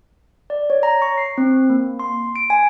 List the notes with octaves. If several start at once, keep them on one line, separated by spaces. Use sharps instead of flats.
D5
C#5
A#5
C#6
C7
C4
A#3
C6
D7
G#5